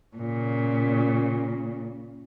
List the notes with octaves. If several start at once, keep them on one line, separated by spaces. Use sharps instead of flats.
A#2 C#3